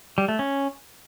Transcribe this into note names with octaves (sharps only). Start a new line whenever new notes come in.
G3
A3
C#4